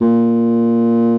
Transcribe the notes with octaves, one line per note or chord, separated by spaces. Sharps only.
A#2